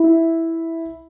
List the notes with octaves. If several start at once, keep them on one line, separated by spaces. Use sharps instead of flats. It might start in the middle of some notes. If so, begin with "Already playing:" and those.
Already playing: E4